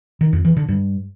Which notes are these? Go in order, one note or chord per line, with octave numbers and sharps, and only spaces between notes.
D#3
F2
E3
D3
G2